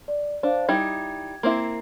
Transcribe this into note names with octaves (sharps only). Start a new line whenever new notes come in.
D5
D4 C5 F5
G3 D#4 E4 G#6
A#3 C4 E4